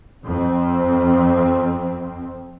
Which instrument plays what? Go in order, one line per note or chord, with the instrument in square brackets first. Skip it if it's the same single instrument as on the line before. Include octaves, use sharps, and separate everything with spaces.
[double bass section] F2 C4